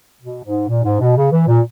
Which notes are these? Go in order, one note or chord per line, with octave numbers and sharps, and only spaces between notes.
B2
G#2
A#2
G#2
B2
C#3
E3
A#2